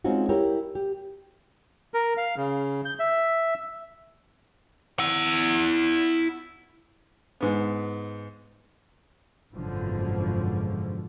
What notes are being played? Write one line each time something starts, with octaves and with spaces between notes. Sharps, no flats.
G#3 C4 C#4 D#4 F4 F#4
E4 G4 A#4 C#5
G4
A#4
F5
C#3
G6
E5
E4 F#5
G#2 B3
G#1 F#2 B2 D3 F3